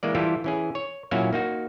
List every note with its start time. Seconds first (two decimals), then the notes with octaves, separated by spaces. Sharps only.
0.03 E3 G#3 A#3 D5
0.15 E3 G3 E4 F4 G4 A4
0.44 E3 C#4 G#4
0.75 C#5
1.11 A#2 F#3 C#4 E4 F#4 F5
1.33 A#3 D#4 F#4